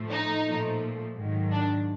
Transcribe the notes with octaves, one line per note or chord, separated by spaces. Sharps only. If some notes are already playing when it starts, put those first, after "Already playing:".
Already playing: A2 F3 A3
D#4
A#2 F3 A3
G#2 D#3 F#3
D4